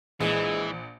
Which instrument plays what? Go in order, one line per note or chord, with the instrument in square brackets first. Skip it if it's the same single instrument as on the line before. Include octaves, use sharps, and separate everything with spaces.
[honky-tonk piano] A#1 [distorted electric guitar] E3 [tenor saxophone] G#3